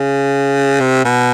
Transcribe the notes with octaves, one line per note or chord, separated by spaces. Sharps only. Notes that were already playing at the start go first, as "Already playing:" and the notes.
Already playing: C#3
C3
B2